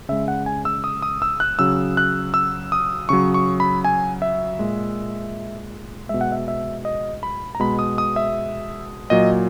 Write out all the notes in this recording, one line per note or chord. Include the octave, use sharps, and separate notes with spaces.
C#3 G#3 E5
F#5
G#5
E6
D#6
D#6
E6
F#6
C#3 F#3 E6
F#6
E6
D#6
C#3 F#3 C#6
C#6
B5
G#5
E5
A#2 G#3
B2 G#3 E5
F#5
E5
E5
D#5
B5
A#5
B2 G#3 B5
D#6
D#6
E5
A#2 F#3 D#5